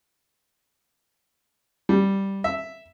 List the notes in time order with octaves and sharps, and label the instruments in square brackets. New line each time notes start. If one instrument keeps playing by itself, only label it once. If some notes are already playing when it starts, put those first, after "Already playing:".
[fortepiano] G3
E5